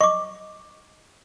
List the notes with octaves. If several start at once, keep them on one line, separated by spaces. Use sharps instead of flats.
D#5 C#6 D6